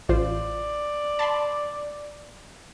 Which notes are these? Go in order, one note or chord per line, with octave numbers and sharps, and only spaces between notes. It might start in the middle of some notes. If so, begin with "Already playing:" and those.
A1 F4 C5 D5
A5 B5 C6